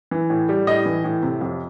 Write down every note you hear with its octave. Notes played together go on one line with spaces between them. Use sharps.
E3
A2
G3
A2 D#5
E3
A2
C3
F2